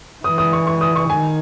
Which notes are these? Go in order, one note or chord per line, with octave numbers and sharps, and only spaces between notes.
E3 D#6
D#6
C#6
C#6
D#6
C#6
D#3 G#5